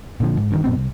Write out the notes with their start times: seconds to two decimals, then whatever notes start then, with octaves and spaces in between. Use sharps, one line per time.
0.20 A#2 D3 F3
0.37 G#2
0.51 D2 G2 D#3
0.64 F#2 A#2 B3 C4
0.77 C2